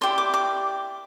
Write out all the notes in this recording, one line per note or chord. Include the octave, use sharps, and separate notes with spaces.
E4 G4 D5 C6
D6
D6